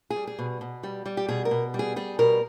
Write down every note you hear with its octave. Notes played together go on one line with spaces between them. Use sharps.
G#4
G3
G#4
B2
B2
G3
G3
G4
B2 G#4
A#4
B2
G3
G#4
G3 G#4
B2 A#4